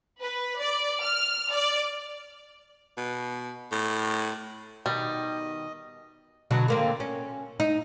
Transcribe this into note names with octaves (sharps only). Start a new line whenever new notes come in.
B4
D5
F6
D5
B2
A2
B2 D#3 G3 D#5
B2 D3 F#3
D3 A#3 C4
C#4
D#4